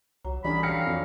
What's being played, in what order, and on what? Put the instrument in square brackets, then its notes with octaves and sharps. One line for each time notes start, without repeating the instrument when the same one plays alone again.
[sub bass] C2 [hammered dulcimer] F#3
[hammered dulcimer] D3 C#4 D#5 [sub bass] E3 [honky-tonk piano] G3 D4 [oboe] B5
[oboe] F5 [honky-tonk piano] G5 A#6 C#7
[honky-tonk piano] F2